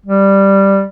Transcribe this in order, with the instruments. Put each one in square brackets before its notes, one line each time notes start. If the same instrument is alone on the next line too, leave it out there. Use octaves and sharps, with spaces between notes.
[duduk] G3